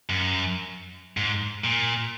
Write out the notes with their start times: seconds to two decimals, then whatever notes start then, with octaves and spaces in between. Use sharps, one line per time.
0.10 F#2
1.17 G#2
1.64 A#2